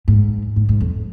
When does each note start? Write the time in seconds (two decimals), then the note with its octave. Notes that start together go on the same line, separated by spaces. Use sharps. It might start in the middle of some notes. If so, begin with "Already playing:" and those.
0.08 G#2
0.56 G#2
0.69 G#2
0.81 F2